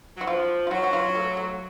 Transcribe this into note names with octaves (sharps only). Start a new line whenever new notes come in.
F#3 F#4
F3 F4
F4
F#3 F#4
F#4
F4
A3
A3